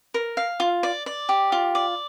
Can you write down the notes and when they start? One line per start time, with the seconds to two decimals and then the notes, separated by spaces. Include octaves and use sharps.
0.14 A#4
0.37 F5
0.60 F4
0.83 D5
1.06 D5
1.29 G4
1.52 F4
1.75 D5